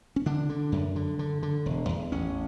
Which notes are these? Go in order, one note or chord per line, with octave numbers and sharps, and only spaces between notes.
C#4
D3 D4
D3
F#2
D3
D3
D3
E1
E2
A1 C#4